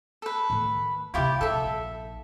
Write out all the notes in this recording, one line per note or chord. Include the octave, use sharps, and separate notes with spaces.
A4 B4
A2 D#3
D2 C3 E4 F4 G4
A#1 D#4 A4 E5